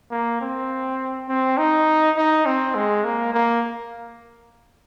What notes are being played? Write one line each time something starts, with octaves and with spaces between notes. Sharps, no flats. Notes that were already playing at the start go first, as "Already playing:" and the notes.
A#3
C4
C4
D#4
D#4
C4
G#3
A#3
A#3